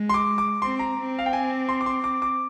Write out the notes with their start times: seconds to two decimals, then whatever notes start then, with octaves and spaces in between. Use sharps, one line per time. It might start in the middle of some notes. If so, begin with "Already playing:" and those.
Already playing: G#3
0.09 C6
0.14 D6
0.38 D6
0.62 C4 C6
0.79 A#5
0.98 C4
1.19 F5
1.26 G5
1.33 G#5
1.69 C6
1.81 D6
1.86 C6
2.04 D6
2.22 D6